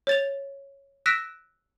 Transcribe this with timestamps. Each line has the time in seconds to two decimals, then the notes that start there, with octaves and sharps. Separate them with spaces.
0.07 C#5 A6 F7
1.06 E6 F#6 A#6 B6 D7 E7